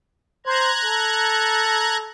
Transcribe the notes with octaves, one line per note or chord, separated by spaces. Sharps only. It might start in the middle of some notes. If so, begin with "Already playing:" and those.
C5 A#5 F#6 G#6
A4